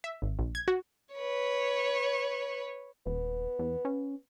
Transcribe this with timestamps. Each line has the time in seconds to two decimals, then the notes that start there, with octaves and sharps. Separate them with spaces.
0.04 E5
0.22 G#1
0.39 A#1
0.55 G#6
0.68 F#4
1.14 B4 C#5
3.06 D#1 B3
3.59 E2
3.85 C#4